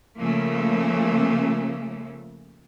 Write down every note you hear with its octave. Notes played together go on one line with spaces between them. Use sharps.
C#3 F3 A3 A#3